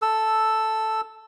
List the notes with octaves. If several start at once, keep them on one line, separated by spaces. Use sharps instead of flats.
A4 E6